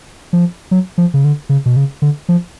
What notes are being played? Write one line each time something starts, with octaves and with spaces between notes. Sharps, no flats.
F3
F#3
F3
C#3
D3
C#3
B2
C#3
D3
F3